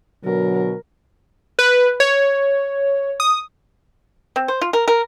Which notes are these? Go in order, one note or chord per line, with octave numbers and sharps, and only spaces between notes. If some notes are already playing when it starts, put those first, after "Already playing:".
B2 D3 F#3 A#4
B4
C#5
D#6
C4
C5
F4
A#4
A#4